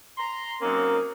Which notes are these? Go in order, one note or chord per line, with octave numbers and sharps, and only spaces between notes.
A#5 C6
F#3 A#3 C4 C#4 D#4